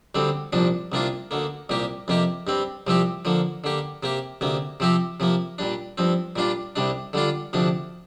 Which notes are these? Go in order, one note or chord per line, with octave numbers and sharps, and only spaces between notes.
D2 D3 G3 C4
C2 A#2 F3 D4
C2 C3 A#3 D4 F4
D2 D3 A#3
C2 A#2 A#3 G4
F2 C3 A#3 G4
G2 G3 C4
C2 C3 F3 C4 G4
D3 F3 A#3
D3 A#3 G4
C3 A#3 G4
D2 C3 A#3
C3 F3 C4 G4
C3 F3 A#3
A#2 G3 D4
G2 F3 C4
A#2 G3 D4 F4
C2 C3 G3 D4
D3 G3 D4 F4
D2 C3 F3 D4